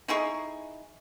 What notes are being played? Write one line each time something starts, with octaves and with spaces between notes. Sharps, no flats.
D#4 E4 G#4 C#6